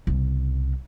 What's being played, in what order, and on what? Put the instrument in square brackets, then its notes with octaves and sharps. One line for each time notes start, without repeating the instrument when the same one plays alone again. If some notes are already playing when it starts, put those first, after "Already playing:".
[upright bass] C2 C#3